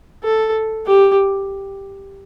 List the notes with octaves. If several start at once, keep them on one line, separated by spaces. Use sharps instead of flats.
A4
G4